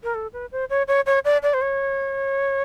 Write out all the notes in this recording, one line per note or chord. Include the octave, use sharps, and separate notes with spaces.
A#4
A4
B4
C5
C#5
C#5
C#5
D5
D5
C5
C#5